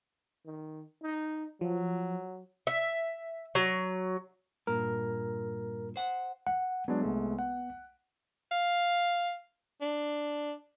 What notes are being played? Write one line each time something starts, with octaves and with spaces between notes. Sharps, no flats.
D#3
D#4
F3 F#3
E5
F#3
G2 A#2 A#4
C5 F#5
F#5
F#3 G#3 B3 D4
C2 G#3 A3
F#5
F5
D4